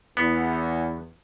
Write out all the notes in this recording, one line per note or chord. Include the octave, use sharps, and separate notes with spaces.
E2 B3